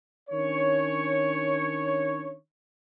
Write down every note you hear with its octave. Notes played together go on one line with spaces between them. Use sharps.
D#3 C#4 D4 C#5